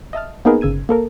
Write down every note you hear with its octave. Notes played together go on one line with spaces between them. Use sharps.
D#5 E5 A5 F6
A#3 B3 D#4 G#4 A#4 B4
G1 C#3 E6 G#6 D#7
A#3 A4 A#4